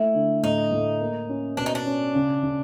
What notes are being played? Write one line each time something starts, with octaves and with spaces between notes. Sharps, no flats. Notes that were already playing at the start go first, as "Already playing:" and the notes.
Already playing: A3 E4
D3
A2 D#4
A2
A#3
C#4
B2 D4
D#4
D4
C#4
C#3
C#3